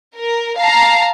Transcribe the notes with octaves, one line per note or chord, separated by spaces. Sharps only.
A#4
F5 A5 A#5